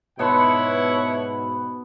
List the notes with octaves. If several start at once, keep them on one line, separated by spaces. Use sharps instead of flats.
G#2 B2 B3 E4 C#5 F#5 A5 C6